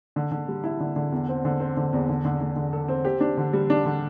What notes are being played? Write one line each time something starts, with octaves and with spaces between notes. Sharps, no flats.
D3
D3
G3
E4
D3
D3
E2
C4
D3
C4
D3
E2
D3
D3
D3
D3
A4
C4
G4
D4
D3
G3
D4
D3